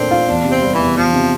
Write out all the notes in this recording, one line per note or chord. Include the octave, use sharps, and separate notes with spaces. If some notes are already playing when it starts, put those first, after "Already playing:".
Already playing: A#2 A3 C4 D4
F4
E2 D4
C3
C4
G3
E3
E2
E2 F3
C3